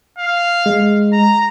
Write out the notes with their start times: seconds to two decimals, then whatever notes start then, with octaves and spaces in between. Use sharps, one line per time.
0.18 F5
0.66 G#3
1.13 A#5